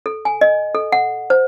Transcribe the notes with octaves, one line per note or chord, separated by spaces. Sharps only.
A4
G#5
D#5
A4
F#5
C5